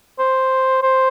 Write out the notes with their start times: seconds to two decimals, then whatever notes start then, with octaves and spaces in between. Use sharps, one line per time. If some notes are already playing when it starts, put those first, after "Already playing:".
0.19 C5
0.83 C5